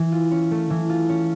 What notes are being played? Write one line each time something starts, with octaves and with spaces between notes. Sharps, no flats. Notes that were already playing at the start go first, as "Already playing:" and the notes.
Already playing: E3
F4
C#4
A3
E3
F4
C#4